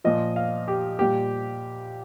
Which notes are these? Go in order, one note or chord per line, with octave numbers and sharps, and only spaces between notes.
A#2 F3 D#5
F5
G4
A#2 G3 G4